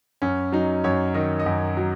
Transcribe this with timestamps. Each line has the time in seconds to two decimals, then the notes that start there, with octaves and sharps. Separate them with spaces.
0.22 F#2 C#4
0.52 F#3 D#4
0.84 F#2 C#5
1.14 D#3 D#5
1.39 D#5
1.46 F#2
1.77 F#3